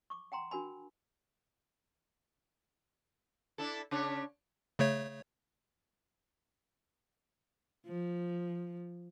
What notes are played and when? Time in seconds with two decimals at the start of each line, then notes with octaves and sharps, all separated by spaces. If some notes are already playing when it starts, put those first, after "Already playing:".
0.10 C#6 D6
0.32 F#5 G5 A#5 C6
0.51 D4 F#4 A#4 G#5 B5
3.58 D4 E4 A4
3.91 C#3 D4 C#5
4.79 C#3 A3 C#5
7.86 F3